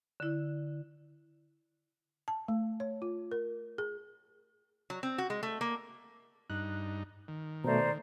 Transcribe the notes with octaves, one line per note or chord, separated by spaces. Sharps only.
D3 E4
A5
A3
C#5
F4
A#4
G#4
F#3
C4
F#4
G#3
A3
A#3
G2 D#4 F#6
D#3
B2 A3 C5 D5 A#5